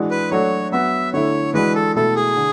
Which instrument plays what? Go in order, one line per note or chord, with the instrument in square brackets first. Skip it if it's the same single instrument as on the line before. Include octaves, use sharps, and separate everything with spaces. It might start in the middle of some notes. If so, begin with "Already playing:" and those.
Already playing: [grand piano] E3 G#3 D4 F#4
[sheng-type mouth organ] B4
[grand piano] F#3 A3 D4 F#4 [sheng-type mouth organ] C#5
[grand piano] F#3 B3 F#4 [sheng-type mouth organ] E5
[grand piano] D3 A3 E4 [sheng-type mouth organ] C#5
[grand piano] E3 G#3 D4 F#4 [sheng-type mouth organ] B4
[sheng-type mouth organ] A4
[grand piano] B2 A3 E4 [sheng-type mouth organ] A4
[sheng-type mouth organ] G#4
[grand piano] D3